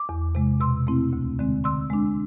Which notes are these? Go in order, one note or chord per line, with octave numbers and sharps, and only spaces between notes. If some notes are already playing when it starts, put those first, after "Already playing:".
Already playing: D6
E2
C3 G#3
B2 C6 E6
A3 C4 E4
D2
D3 G#3 C4
D3 C6 E6
G#3 D4